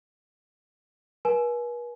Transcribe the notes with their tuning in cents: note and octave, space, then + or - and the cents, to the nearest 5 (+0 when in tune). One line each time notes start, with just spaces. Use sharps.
B4 -45 G#5 +30